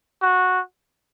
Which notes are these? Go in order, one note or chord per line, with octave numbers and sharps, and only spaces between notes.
F#4